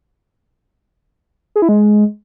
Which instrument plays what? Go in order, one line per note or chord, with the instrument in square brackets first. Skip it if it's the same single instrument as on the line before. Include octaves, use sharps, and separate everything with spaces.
[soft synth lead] G#4
E4
G#3